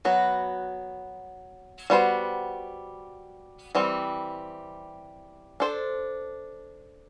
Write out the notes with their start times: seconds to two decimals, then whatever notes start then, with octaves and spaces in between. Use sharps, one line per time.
0.05 F#3 B3 F#4
1.90 G3 B3 F#4 C5
3.75 E3 G3 C4
5.60 D4 A4 C5